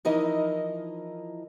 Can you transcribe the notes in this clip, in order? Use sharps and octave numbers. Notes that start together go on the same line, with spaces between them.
E3 F3 D#4 E4 A#4 D#5